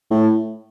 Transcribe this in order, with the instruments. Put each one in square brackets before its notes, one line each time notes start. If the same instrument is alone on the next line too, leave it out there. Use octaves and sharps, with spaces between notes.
[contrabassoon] A2